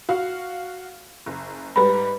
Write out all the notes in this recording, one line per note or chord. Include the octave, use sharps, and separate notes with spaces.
F#4 F5
F#1
G#2 G3 B4 B5